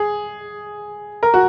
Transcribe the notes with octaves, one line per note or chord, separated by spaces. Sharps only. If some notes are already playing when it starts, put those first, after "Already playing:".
Already playing: G#4
A#4
F#4